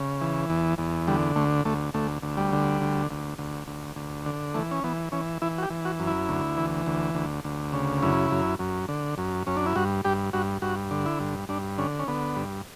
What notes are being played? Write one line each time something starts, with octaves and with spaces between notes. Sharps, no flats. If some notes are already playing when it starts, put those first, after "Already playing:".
Already playing: C#3
E3
E2
E2
D3 G3
D2 A3
D2 A3
D2 A3
D2
G3
D3
D2
D2
D2
D2
D2
D3
E3 A3
C#4
E3 B3
E3 C#4
E3 E4
F#4
G4
E3
F#4
F#2
E4
D2
E3
D2
D2
D2
C#3
F#2 E4
F#2
F#2
D3
F#2
F#2 C#4
D4
E4
G2 F#4
G2 G4
G2 F#4
G2 F#4
D3
E4
G2
G2 D4
D3 C#4
C#4
D3 B3
G2